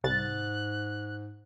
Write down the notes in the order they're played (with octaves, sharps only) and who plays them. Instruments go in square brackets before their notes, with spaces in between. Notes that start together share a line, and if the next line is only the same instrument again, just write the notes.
[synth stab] C2 A6 [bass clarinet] G#2 [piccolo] F#6